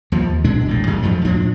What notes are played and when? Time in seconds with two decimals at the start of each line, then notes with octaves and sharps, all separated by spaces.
0.12 D#2 F3
0.44 B2 G#3 D4
0.66 A#1 E2 A2
0.87 F#2 A2 G#3
1.02 F2 G#2 F3 F#3
1.25 D2 A2 F3 D4